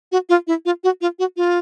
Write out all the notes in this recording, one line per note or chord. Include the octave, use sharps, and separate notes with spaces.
F#4
F4
E4
F4
F#4
F4
F#4
F4